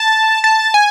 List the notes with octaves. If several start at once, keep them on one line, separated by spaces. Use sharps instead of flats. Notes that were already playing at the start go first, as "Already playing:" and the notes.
Already playing: A5
A5
G#5